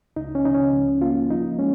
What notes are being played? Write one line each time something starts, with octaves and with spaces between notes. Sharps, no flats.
C#2 D#4
C#4
C#3 D#4
C#4
C#2
A#3 F4
F3 D#4
G#3 C#4